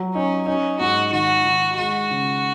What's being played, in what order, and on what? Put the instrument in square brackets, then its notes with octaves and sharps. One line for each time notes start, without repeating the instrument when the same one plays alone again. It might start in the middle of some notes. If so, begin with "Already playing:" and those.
Already playing: [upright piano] F#3
[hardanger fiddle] C#4 [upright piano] D#4
[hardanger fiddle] C#4 [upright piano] D#4
[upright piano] G#2 [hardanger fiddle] F#4
[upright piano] D#3 [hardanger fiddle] F#4
[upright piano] D#3
[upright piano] G#3 [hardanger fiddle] F#4
[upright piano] C#3